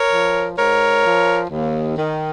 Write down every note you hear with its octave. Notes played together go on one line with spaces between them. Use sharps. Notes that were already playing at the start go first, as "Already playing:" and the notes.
Already playing: A#4 C#5
F3
G#2 A#4 C#5
F3
D#2
D#3